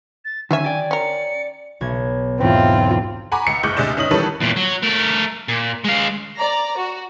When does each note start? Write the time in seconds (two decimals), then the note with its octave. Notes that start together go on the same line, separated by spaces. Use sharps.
0.25 A6
0.51 D3 D#3 F#3 C#4 E5 G#5
0.66 D5 G5
0.91 C#4 A#4 C#7
1.81 B1 G#6
2.40 E2 G#2 C4 F4
3.32 F#5 G#5 A#5 B5 C#6 D6
3.47 C#2 C#7
3.63 F#1 G#3 C#6 D6 F#6 G6
3.77 D2 C3 G#3 D5 D#5 E7
3.97 G1 C#4 D#4 D#6 F#7
4.11 D#3 E3 G3 A4 B4 C#5
4.40 E2 A#2
4.56 F#3
4.83 A3 A#4
5.48 A#2
5.84 G#3 F5
6.37 D5 A#5
6.77 F#4